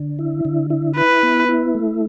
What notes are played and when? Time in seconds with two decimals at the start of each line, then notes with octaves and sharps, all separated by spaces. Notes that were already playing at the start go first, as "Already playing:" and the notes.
Already playing: D3
0.19 E4
0.45 D3
0.70 E4
0.96 E4 B4
1.23 B3
1.49 E4
1.75 A3